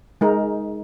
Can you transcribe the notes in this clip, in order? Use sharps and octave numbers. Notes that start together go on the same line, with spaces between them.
G#3 D#4 A#4